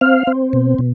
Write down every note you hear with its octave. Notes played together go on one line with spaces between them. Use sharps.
C4 F5
C4
B2
B2